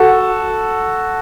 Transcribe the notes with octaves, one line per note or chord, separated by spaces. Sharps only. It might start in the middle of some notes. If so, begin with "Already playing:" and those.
Already playing: F#4 A4